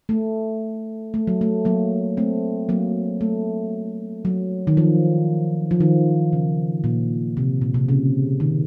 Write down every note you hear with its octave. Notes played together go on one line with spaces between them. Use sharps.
A3
A3
F#3
A3
F#3 A#3
A3 C4
F#3 A#3
A3
F#3
D#3
F3
F3
D#3
C#3
A#2
C3
A#2
C3
C#3
D#3